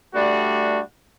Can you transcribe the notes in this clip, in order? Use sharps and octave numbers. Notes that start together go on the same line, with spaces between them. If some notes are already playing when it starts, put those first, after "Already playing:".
G3 A3 D4 F#4